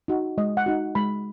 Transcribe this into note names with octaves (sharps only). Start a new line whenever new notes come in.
D#4 F#4
G#3 D#5
F#5
D#4 F#4
G#3 B5